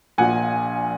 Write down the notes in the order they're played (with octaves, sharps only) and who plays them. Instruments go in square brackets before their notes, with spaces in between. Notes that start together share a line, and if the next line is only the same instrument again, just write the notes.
[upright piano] A#1 A#2 F3 F#5 G#5